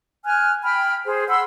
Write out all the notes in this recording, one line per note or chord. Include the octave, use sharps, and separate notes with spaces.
G#5 F6 F#6
G5 B5 F6
G#4 C5
F#5 B5 C6 E6